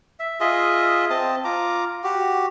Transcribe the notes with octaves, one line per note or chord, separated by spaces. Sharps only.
E5
F4 G#4 D#5 E5
C4 D#5 A5
F4 A#5 D6
F#4 G4